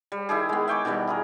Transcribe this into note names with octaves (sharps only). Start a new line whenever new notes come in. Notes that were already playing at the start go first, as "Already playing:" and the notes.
G3
D#3 E4 G4 G#4
G#3 B3
E5 G5 C#6 D6
B2 D#3 E3 G3
E4 G#4 A#4